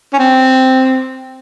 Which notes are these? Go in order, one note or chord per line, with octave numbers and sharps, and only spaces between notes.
C#4
C4